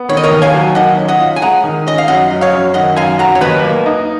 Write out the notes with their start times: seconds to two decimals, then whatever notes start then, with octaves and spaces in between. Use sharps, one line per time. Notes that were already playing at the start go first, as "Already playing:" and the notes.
Already playing: B3
0.09 D#3 C#5
0.17 D#5
0.24 A#4 C#5
0.31 D#2
0.42 F5 G#5
0.54 F#3
0.75 D#3 D#5 F#5
0.98 C#4
1.08 D#5 F#5
1.20 F4
1.36 G#5
1.42 G#3 F#5 A#5
1.64 D#3
1.87 C#4 D#5
1.98 F5
2.08 F#2 D#5 F#5
2.31 F#3
2.41 C#5 F5
2.53 F#2
2.74 D#3 D#5 F#5
2.96 F#2 F5 G#5
3.19 F#3 F#5 A#5
3.35 C#5
3.41 D#2 B4 D#5
3.63 A#3
3.86 D#4